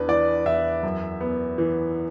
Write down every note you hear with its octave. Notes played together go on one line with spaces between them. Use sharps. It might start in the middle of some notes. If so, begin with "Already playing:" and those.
Already playing: E2 D4 B4
E3 D5
E2 E5
F#2
B3
E3